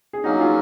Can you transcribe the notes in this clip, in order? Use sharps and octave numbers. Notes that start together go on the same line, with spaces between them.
G#4
F#3 A#3 C#4 D#4 F#4
F4 G#4